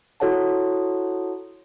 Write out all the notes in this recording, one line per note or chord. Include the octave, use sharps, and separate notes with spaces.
E4 F#4 A4 C#5 F#5 A5